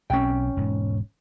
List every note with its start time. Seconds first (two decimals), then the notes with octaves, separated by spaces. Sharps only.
0.10 B1 C4 C#4 G5
0.57 E1 G#2